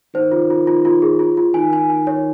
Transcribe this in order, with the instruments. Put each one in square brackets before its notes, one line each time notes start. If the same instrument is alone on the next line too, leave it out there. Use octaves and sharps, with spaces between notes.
[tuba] D#3 [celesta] C5
[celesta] F4
F4
F4
F4
G#4
F4
F4
[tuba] D#3 [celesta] G#5
[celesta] G#5
G#5
C#5